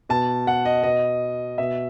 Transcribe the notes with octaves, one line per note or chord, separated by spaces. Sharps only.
B2 A5
F#5
D#5
B2 D#5
B2 E5